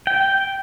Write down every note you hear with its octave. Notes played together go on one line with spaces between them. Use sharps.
G5